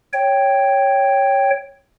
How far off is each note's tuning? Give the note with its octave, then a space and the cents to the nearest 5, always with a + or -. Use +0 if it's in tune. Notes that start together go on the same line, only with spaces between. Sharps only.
C#5 +0 G5 +0